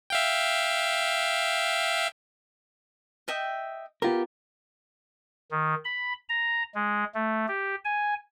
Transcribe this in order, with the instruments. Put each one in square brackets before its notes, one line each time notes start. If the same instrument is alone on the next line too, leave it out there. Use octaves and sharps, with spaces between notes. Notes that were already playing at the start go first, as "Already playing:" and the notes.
[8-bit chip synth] E5 F5 G5
[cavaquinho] D#5 E5 G5
[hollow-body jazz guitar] B3 F4 A#4 [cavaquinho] G4
[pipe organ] D#3
B5
A#5
G#3
A3
G4
G#5